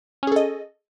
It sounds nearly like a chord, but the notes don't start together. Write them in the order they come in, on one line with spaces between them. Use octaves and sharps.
C#4 G#4 A4 D#5